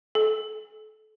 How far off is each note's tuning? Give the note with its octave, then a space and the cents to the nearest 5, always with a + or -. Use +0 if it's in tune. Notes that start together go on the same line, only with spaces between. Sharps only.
A4 -30